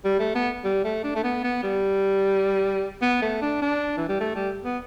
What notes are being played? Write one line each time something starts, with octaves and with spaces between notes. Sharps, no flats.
G3
A3
B3
G3
A3
D4
A3
B3
B3
G3
B3
A3
D4
D4
E3
G3
A3
G3
B3